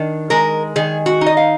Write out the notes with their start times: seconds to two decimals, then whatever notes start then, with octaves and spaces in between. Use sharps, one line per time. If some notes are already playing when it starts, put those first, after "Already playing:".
Already playing: D#3 D4
0.30 G#3 A#4
0.76 D#3 G#4
1.06 F#4
1.21 D#4
1.26 D#5
1.37 F5